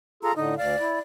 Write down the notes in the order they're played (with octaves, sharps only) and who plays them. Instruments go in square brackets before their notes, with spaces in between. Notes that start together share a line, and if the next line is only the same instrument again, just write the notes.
[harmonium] F4 G#4 A4 [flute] A#5
[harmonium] A2 D3 [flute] D#4
[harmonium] D2 F5 [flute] D5
[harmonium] E4